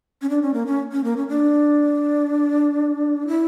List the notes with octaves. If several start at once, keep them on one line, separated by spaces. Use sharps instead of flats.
C#4
D4
C#4
A#3
C#4
C#4
A#3
C#4
D4
E4